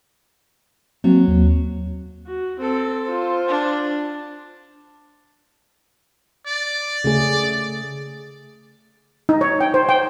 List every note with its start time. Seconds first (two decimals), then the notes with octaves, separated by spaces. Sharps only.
1.04 F#3 A#3 C4
1.28 D#2
2.26 F#4
2.61 C4 A4
3.05 F4 C5
3.48 D4
6.47 D5
7.04 C#3 A3 G#4
9.29 D#4
9.41 C#5
9.61 G5
9.74 C5
9.89 G5